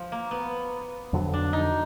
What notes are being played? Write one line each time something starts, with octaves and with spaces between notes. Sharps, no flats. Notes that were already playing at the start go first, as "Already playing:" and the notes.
Already playing: F3
A#3
B3
F2 D3 F#3
D4
D#4